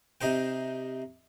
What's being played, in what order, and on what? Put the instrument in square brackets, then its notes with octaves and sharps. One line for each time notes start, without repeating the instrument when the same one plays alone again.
[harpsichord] C3 D#4 C5 G5